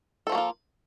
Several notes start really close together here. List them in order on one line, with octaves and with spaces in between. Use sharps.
A4 F3 F#4 A#3 F4